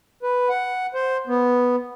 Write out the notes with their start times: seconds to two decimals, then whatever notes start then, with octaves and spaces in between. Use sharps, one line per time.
0.23 B4
0.49 F#5
0.94 C5
1.27 B3